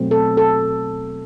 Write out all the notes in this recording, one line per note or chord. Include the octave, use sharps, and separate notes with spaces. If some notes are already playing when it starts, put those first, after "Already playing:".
Already playing: B2 F#3 A3 C4
A4
A4